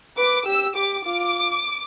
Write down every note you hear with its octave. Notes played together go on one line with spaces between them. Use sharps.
B4 D6
G4 E6
G4 D6
F4 D6